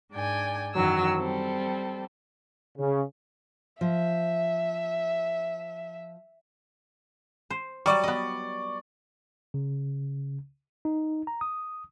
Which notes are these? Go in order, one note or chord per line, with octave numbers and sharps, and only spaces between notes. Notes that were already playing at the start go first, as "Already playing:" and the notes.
G#2 D4 G5 G#5
F#2 D#3 E3 F#3 E6 F6
G3 C4 A4
C#3
F3 E5
C5
F#3 G3 D5 C#6
B3 D#5
C#3
D#4
A#5
D#6